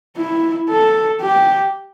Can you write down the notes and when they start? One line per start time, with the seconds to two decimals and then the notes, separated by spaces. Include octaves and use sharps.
0.17 E4
0.70 A4
1.21 G4